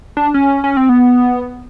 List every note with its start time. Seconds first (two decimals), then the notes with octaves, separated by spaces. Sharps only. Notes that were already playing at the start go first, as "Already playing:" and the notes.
0.17 D4
0.34 C#4
0.64 C#4
0.77 C4
0.89 B3